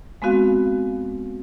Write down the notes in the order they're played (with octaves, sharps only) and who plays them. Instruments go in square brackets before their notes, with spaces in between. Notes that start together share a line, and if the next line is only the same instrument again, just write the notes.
[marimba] G#3 B3 C4 F#4 F5